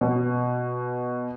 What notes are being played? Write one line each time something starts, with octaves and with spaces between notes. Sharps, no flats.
B2